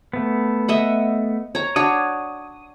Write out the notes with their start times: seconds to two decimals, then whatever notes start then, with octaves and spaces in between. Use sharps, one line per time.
0.13 A3 B3
0.68 D#5 E5 F#5
1.55 C#5 A#5
1.76 D4 F#4 C#5 D#6